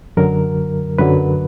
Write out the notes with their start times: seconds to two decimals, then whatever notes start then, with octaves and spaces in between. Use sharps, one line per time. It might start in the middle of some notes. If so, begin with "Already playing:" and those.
0.17 F#2 D3 F#3 A#4
0.98 F#2 D3 F#3 B4